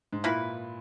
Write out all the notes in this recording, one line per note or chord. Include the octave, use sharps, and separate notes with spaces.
G#2
A#2 E3 A#3 E4 B4